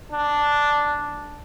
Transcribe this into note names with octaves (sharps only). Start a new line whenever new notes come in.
D4